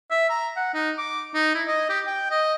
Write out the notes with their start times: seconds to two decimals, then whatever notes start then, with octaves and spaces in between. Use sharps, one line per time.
0.11 E5
0.30 A#5
0.56 F#5
0.74 D#4
0.98 D6
1.34 D#4
1.55 E4
1.67 D#5
1.89 G4
2.07 G5
2.31 D#5